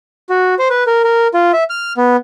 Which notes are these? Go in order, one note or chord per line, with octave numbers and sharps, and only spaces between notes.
F#4
C5
B4
A#4
A#4
F4
E5
F6
B3